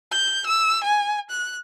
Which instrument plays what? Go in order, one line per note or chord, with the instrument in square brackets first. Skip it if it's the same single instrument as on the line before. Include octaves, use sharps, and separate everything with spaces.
[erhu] G6
E6
G#5
F#6